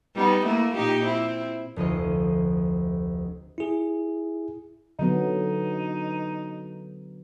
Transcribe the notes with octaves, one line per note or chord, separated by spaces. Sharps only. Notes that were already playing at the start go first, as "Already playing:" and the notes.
G3 B3 D#4
A3 A#3 E4
A#2 D#4 G4
C4 E4
F1 D2 F4 D#5
E4 G#4
D3 F#3 B3 D#4